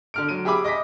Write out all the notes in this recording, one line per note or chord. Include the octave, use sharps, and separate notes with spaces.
D3 F6 D7
F#3 D7 D#7
G4 G#4 E5 B5 D6
D#5 D6 A#6 B6